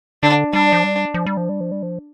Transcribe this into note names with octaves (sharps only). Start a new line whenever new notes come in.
D3 D4
G3 D4
F3
G3
F3
G3
F3
G3
F3
G3
F3